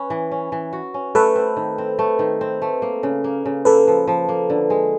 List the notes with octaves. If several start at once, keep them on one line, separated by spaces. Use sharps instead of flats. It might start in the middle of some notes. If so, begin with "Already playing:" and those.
Already playing: C#4 B4
E3
C#4
E3
F#4
C#4
A3 A4 B4
C4
D#3
C4
A3
D#3
C4
A3
A#3
C#3
A#3
C#3
A#3 A4 B4
F3
F3
A#3
D3
G#3